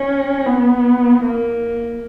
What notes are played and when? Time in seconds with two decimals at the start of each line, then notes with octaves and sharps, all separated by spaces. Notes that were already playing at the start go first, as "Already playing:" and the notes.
Already playing: C#4
0.46 B3
1.23 A#3